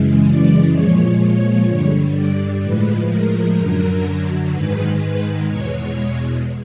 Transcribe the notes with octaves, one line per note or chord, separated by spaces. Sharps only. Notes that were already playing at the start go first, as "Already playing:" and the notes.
Already playing: F#2 C#3 E3 G#3
D5
A#2 F3 G#3 C#5
C#5
G2 D3 G3
D5
A2 F3 G#3 B4
A#4
F#2 D3 F#3
G#2 D#3 G#3 B4
B4
E2 B2 G#3 C#5